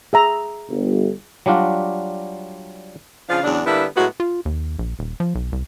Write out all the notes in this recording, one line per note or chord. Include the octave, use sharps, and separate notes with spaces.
G#4 E5 A#5
G1
F#3 G3 D4 F4 F#4
C#3 F3 D4 F4 G#4 F5
E2 C#3 F#3 D4
D3 G3 A#3 B3 D4 E4
A2 F#3 G#3 B3 E4 F#4
F4
D#2
A#1
D#1
F3
B1
C2